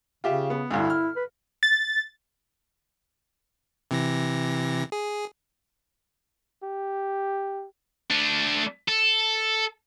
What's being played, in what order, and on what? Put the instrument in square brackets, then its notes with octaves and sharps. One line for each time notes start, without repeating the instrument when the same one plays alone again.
[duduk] C#3 [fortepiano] F4 G4 E5
[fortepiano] B3
[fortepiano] D2 G2 [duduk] E4
[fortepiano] F6
[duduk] B4
[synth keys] A6
[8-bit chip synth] C3 E3 A#6
G#4
[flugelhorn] G4
[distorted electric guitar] A3 D4
A4